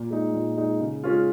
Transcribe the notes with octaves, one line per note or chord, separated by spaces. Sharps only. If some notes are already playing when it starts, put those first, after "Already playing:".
Already playing: A#2
G#3 D#4
A#2
G#3 D#4
C#3
G#3 C#4 F4